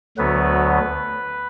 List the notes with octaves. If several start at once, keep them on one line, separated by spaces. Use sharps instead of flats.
D2 D3 F#3 B3 B4